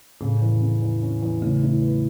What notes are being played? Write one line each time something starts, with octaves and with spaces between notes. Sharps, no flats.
A2 C#3
E2
C#3
E2
C#4
E2
A2 C#3
A2
B3